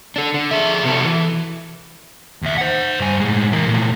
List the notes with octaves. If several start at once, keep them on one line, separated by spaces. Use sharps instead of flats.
D4 A4
D3
F2 G#4 E5
C3 B3 F#4 A4
E3
D#2 E5
C5 F#5
G2 G#5
A2 G#3
E3 A#4
A#2 A3